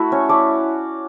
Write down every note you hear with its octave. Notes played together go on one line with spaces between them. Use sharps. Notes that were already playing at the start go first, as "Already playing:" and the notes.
Already playing: A3 E4 F#4
C#4 C#5
A3 D5